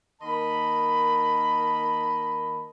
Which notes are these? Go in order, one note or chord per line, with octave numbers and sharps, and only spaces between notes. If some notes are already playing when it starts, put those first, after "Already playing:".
D#3 A#3 A#4 D#5 A5 B5